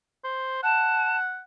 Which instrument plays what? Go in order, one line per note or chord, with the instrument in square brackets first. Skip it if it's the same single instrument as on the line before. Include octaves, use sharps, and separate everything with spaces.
[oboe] C5
[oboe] F#5 [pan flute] A5